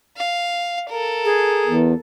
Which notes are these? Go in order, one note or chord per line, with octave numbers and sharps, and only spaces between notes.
F5
A4 A#4
G#4
E2